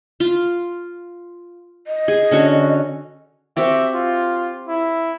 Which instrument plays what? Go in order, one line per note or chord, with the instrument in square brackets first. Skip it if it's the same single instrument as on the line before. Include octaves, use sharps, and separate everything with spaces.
[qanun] F4
[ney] D#5
[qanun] G#4
D3 C#4 F#4
[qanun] C4 F#4 G4 [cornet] E5
[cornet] F4
E4